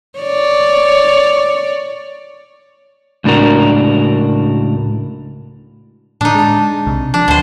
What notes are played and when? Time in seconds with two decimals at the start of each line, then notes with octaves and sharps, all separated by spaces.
0.19 C#5 D5
3.24 C#2 A2 D4 F#4 A#4
6.21 A2 D3 D4 D#4
6.35 G#3 A5
6.86 B1 C3
7.14 F3 D4
7.28 D2 B2 C5